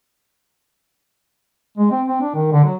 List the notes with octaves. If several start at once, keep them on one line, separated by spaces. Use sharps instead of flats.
G#3
C4
C4
D4
D#3
D3
F#3